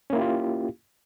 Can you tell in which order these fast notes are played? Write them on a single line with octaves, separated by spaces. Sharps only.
C#4 A#3 E4 G4 F4